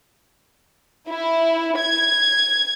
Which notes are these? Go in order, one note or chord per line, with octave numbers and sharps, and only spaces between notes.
E4
G#6